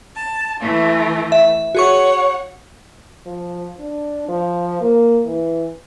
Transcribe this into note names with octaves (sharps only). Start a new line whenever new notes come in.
A5
E3 A3
E5
F#4 G#4 C#5 F#5 C#6
F3
D4
F3
A#3
E3